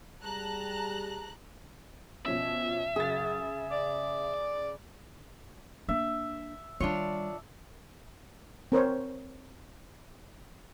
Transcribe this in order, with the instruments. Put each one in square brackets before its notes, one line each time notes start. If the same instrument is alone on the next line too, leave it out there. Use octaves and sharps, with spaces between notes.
[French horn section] G3 G4 G#4 [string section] A5 A#5 F#6
[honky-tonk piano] B2 F3 C#4 [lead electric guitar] E5
[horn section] F#2 [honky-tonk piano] C#3 A6 [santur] G#4
[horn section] D5
[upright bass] A#3 D4 [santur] E5
[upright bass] D#3 G3 [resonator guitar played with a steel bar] D4 F4 C#5
[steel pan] C4 A#4 C5 C#5